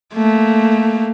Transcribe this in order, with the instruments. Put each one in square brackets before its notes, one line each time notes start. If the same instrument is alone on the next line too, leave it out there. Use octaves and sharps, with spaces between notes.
[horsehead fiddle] A3 A#3